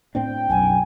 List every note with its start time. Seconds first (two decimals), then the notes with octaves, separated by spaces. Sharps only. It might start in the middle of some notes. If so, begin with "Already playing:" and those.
0.15 A2 C4 D4 G5
0.50 B1 F#2 G#5